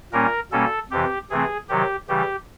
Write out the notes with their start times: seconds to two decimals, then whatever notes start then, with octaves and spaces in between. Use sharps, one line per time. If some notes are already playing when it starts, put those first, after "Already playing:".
0.12 A#2 G3 A#3 C#4 A#4
0.52 B2 G3 A#3 C#4 A4
0.91 F2 C3 E3 G4
1.30 C3 E3 A3 C4 G#4
1.69 C3 D#3 F#3 G4
2.08 C#3 E3 G3 G4